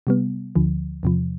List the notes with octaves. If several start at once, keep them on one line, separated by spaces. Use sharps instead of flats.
C3 G3 B3
D2 D3 F3
E2 C3 F3